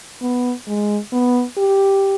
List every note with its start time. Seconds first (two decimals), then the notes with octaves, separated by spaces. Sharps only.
0.21 B3
0.67 G#3
1.12 B3
1.57 G4